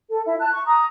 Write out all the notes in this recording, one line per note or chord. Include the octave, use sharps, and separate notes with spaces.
A4
E4 E5
A5 F#6
C#6
A#5 D#6